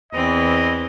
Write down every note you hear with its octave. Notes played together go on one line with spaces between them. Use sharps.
E2 E3 C4 D#5